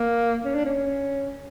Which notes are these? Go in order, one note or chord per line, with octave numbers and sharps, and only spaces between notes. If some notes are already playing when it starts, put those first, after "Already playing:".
Already playing: A#3
C#4
D4
C#4